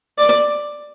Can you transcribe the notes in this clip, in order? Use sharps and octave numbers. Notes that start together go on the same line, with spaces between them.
D5